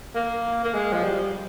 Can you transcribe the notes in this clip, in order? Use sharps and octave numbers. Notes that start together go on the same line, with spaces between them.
A#3
A#3
G#3
F3
G3